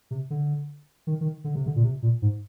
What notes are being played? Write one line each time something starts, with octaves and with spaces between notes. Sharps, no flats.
C3
D3
D#3
D#3
D3
C3
D3
A#2
C3
A#2
G#2